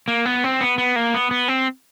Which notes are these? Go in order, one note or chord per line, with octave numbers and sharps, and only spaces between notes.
A#3
B3
C4
B3
B3
A#3
B3
B3
C4